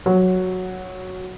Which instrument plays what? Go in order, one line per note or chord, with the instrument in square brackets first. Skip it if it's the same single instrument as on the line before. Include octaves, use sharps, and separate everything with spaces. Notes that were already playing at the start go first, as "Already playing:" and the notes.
[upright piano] F#3